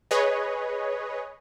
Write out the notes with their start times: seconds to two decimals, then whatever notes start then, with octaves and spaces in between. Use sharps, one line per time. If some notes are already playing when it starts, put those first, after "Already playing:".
0.11 G#4 B4 C#5 D#5